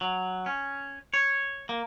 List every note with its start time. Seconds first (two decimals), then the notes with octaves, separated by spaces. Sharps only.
0.01 F#3
0.46 C#4
1.14 C#5
1.69 A#3